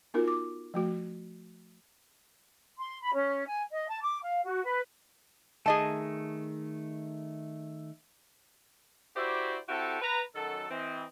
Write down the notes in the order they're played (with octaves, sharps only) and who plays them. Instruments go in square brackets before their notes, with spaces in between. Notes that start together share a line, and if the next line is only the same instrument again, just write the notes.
[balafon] B3 D#4 F4 F#4 A#4
D6
F3 A3 F#4
[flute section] C6
B5
C#4
G#5
D#5
A5
D6
F5
F#4
B4
[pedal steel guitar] D#3 A3 [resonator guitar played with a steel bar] G#4 D#5 A5
[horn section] E4 F#4 G4 C5 D5 E5
C4 E4 F#4 G4 A4
B4 A#5
F#2 D#3 F#3 A4
E3 C4 D#5